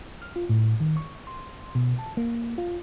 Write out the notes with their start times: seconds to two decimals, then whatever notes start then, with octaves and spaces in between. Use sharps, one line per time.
0.22 F6
0.36 F4
0.49 A2
0.80 D#3
0.97 C#6
1.27 C6
1.75 B2
1.99 A5
2.17 A#3
2.58 F4